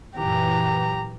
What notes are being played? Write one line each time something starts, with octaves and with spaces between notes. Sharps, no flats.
F#2 A#2 E3 G4 A#5